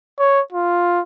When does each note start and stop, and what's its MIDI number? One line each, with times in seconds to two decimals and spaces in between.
0.19 0.40 73
0.52 1.00 65